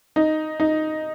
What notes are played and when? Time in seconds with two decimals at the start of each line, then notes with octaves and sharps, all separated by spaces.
0.16 D#4
0.60 D#4